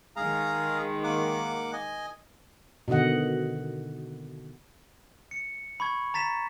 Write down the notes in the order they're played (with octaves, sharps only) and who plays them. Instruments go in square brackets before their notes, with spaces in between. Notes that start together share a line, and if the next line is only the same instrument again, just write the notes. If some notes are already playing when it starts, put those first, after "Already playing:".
[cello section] D#3 G#3 [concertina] G#4 F5 A#5
[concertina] A#3 F#5 D6
D#5 G#5
[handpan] B2 D3 D#3 D#5 F#5
[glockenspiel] C#7
B5 C#6 G#6
A#5 A6 B6 E7